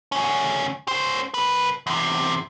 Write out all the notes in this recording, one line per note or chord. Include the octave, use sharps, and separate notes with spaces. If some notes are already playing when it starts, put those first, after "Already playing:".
D2 C#4
C#4 C5
C2 B4
E2 C3